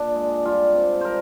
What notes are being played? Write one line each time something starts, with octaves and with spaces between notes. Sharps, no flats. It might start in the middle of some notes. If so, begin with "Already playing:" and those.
Already playing: A#2 D4
G#3
G3 F4
C3
G3 A#4 C5